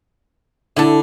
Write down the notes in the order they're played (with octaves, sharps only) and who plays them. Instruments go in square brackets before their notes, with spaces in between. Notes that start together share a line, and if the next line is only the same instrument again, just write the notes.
[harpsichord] D3 [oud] E4 A4